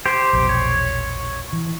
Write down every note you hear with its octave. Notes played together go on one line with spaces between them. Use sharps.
G4 C5
E1 A#1
C#5
E3